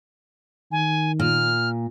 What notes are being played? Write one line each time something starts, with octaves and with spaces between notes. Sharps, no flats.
D#3 G#5
A#2 F6